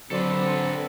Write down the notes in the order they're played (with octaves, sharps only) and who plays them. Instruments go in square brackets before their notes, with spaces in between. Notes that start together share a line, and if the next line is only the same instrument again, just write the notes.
[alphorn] D3 [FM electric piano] F#3 D5 C6 [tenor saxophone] C4 [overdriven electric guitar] A4 B4